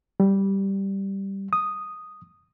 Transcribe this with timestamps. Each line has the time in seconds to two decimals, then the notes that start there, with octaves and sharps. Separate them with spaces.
0.20 G3
1.53 D#6